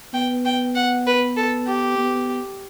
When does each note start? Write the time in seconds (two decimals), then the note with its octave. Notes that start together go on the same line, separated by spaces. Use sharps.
0.14 B3 G5
0.45 G5
0.76 F#5
1.07 B4
1.37 A4
1.67 G4
1.98 B3